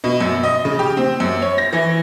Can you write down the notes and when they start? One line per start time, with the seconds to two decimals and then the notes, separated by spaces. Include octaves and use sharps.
0.04 B2
0.20 F#2
0.43 D#5
0.65 C#3
0.79 G4
0.97 C4
1.20 F#2
1.42 C#5
1.58 A#6
1.73 E3